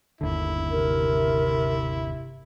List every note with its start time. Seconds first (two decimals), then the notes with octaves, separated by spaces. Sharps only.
0.21 G1 D#2 D3 E4
0.71 C3 A#4